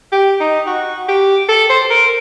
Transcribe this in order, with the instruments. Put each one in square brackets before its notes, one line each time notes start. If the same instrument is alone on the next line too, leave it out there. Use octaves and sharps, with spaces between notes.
[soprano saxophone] G4
D#4
F#4
G4
A4
C5
A#4